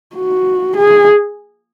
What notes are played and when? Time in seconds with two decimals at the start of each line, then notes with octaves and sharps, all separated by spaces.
0.16 F#4
0.76 G#4